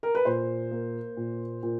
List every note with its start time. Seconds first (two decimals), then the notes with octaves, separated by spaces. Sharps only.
0.03 A#4
0.15 B4
0.25 A#2 C5
0.71 A#3
1.17 A#2
1.63 A#2